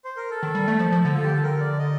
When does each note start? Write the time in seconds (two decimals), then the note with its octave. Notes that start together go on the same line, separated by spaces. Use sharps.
0.05 C5
0.17 A#4
0.30 A4
0.43 D#3
0.55 G3
0.68 A3
0.79 F3
0.92 F3
1.05 D3
1.14 F4
1.23 G4
1.33 A4
1.43 A#4
1.61 D5
1.79 D#5